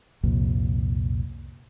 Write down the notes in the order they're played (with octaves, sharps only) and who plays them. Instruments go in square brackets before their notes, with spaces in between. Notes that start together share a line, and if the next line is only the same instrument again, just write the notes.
[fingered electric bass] C2 F2 A#2